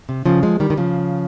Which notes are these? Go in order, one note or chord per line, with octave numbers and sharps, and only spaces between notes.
C3
C#3 F3
F3 G#3
D#3 G3
D#3
C#3 F3